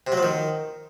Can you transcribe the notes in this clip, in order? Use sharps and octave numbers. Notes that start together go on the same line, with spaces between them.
C3
F#3
F3
D#3